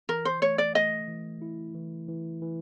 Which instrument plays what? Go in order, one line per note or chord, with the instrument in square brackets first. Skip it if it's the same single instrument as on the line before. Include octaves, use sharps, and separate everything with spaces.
[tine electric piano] E3 [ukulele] A#4
[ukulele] C5
[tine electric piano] A3 [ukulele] C#5
[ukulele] D5
[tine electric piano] A3 [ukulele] D#5
[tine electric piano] E3
E4
E3
E3
E3